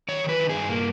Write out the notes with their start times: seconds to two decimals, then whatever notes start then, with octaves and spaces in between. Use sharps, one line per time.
0.08 D#3 C#5
0.24 D#3 B4
0.39 D#3
0.49 G#4
0.55 G2
0.69 A#2 A#3